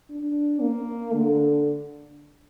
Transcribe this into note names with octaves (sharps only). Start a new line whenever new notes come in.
D4
A#3
D3